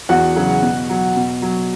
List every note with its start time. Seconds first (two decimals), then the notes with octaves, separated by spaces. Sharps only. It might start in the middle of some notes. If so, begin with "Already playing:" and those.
0.09 E2 F#4 F#5
0.36 C#3 F#3
0.63 B2
0.90 F#3
1.16 B2
1.42 F#3